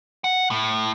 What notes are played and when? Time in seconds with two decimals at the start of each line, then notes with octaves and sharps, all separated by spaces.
0.24 F#5
0.51 A2